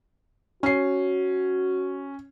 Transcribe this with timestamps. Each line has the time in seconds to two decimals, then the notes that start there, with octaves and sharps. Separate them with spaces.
0.63 C#4 F#4 C7